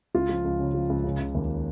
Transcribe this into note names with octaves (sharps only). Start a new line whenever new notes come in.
C#2 F4
F3
C#2
C#3
F3
C#2
C#3
C#3
D#2